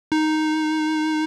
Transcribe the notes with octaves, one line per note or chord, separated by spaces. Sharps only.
D#4